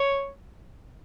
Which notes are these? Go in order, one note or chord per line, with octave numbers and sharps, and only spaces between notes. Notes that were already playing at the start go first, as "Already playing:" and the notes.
Already playing: C#5